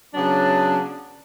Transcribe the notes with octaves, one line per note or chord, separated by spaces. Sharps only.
C#3 F#3 B3 D4